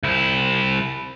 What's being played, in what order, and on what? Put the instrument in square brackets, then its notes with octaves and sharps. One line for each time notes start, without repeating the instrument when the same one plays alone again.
[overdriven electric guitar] C2 E4